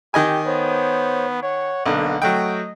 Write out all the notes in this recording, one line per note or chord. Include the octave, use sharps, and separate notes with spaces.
D#3 G4 D#5 G#5
B3 C5 C#5
C#5 F#5
B1 D3 A#3
F#3 A3 D#5 G5